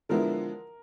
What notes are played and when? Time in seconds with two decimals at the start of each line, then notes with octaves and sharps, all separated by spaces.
0.09 D3 F3 G#3 B3 E4 A#4